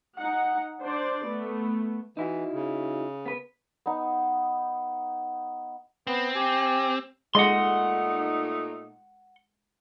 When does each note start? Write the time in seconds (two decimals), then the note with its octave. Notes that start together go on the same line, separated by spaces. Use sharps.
0.16 D#4 F#5
0.81 D4 C5 D5
1.27 A3 B3
2.17 E3 D#4 E4 F#4
2.53 C#3
3.26 B3 B4
3.86 B3 D#4
6.07 B3 C4
6.35 G4 G#5
7.35 A#2 G#3 A3 D#4 D#5 F#5 C6